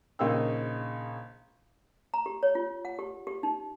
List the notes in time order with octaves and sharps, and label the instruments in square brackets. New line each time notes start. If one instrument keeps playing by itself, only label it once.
[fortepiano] A#1 C#3 D#4 A#4 G5 E6
[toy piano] A#5
G4
C#5
F4
F#5
G4
G4
D#4